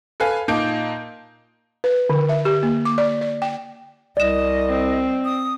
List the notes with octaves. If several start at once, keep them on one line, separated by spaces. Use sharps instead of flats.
A4 B4 F5 G#5
A#2 A#3 D#4 A5 G6 D7
B4
D3
E5
G4
A#3
D6
D5
D5
G5
C2 D5 D#5 E7
C4
D#6